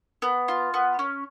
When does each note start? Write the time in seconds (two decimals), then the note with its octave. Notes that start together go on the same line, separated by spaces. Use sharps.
0.22 B3
0.48 F4
0.74 B3
0.99 C#4